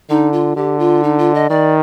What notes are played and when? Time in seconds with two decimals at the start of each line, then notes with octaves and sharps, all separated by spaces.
0.10 D3 D#4
0.33 F4
0.56 D3 G4
0.79 F4
1.03 D#4
1.18 F4
1.34 D#5
1.50 D#3 D5